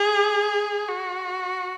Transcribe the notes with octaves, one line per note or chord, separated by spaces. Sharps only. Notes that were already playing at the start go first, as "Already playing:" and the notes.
Already playing: G#4
F#4